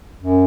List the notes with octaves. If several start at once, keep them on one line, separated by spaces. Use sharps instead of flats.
F#2